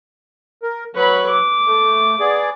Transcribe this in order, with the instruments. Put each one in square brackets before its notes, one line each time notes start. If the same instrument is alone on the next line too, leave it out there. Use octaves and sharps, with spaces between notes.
[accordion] A#4
[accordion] F#3 C#6 [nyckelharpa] B4 B5
[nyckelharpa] D6
[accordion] A3
B3 G#4 D5